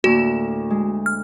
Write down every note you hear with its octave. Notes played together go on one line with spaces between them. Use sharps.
D2 A2 A#3 F#4
G#3
F6